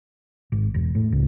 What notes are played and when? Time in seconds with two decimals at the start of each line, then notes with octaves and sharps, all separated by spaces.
0.52 G#1
0.74 E1
0.95 A2
1.12 C#2